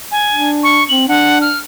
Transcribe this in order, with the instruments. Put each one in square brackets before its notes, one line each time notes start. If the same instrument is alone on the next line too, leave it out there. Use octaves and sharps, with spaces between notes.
[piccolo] G#5
[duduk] D4
[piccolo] C#6
[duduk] C4 [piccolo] F#7
[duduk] D4 [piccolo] F#5
[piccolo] F6